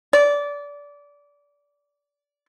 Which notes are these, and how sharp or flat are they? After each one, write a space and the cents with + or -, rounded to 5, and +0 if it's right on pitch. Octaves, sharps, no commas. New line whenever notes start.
D5 -25